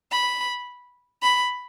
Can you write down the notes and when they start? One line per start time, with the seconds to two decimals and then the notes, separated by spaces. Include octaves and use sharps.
0.11 B5
1.23 B5